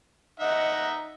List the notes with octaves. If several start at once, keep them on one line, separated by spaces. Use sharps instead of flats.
D#4 D#5 E5 F#5